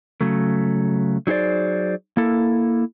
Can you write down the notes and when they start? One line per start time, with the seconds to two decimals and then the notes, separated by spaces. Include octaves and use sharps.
0.21 C#3 F#3 A3
1.27 F#3 D#4 G#4 C5 D5
2.17 A#3 E4 A4